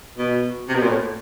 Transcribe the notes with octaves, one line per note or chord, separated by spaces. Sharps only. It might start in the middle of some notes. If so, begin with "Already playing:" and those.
B2
C3
B2
A#2
A2